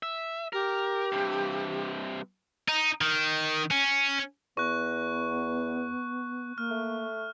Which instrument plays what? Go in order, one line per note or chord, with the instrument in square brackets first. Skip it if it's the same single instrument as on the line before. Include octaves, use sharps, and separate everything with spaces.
[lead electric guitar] E5
[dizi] G4 [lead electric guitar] A#4
[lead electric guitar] G2 C3
[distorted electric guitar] D#4
D#3
C#4
[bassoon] E2 [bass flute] B3 [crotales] C#6 F#6
[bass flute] A#3 [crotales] F6
[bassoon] A3